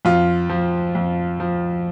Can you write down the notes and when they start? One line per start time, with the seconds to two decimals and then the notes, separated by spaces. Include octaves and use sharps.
0.05 F2 F4
0.50 F3
0.95 F2
1.40 F3